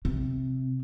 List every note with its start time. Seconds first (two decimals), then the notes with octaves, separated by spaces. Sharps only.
0.05 C3